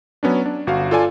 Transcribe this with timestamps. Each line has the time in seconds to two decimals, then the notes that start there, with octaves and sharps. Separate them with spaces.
0.23 F#3 B3 C#4 D4
0.46 D4
0.67 G1 F#4 F5
0.91 F4 A4 D5 G#5